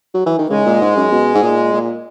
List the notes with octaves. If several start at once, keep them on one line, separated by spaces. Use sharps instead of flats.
F#3
E3
D#3
C#3 G#3
A#2
G#2
F#2
B2
G#2
A#2
A#2